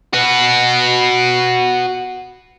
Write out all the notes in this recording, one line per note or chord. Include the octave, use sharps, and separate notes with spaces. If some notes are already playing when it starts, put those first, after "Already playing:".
F#4 B4